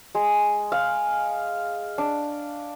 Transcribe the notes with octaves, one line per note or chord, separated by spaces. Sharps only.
G#3
F5
D4